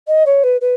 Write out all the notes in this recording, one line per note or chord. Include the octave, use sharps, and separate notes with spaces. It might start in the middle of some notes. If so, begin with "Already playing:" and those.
D#5
C#5
B4
B4